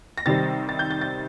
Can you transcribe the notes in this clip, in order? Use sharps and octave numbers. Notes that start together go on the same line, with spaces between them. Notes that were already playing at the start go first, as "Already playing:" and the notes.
A#6
C3 D#3 G3 C4 A6
A6
G6
A6
A6